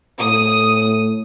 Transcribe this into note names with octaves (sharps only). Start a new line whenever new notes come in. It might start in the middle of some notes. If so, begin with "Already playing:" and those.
A2 D#6